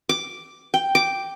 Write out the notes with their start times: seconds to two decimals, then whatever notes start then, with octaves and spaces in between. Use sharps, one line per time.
0.09 D6
0.74 G5
0.95 D6